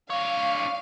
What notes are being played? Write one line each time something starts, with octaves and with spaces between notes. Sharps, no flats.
D4 C#5 F5